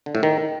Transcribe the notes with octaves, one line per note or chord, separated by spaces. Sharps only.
D3
A2
D#3